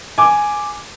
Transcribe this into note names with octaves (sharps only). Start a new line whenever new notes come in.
G#5 D6